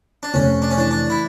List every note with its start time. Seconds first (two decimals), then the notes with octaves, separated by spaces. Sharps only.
0.23 D4
0.34 F1 C#4
0.62 D4
0.71 C#4
0.78 E3 D4
0.91 D4
1.10 E4